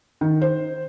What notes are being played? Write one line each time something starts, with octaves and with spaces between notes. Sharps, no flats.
D#3
C5